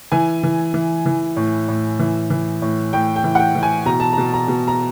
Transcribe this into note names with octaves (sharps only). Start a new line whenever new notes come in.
E3 G#5
E3
E3
E3
A2
A2
E3
E3
A2
A2 G5
G5
E3
F#5
G5
E3
G#5
B2 A#5
A5
A#5
B2
A#5
B2
A#5